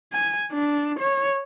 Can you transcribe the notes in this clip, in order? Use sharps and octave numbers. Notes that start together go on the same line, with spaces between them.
G#5
D4
C#5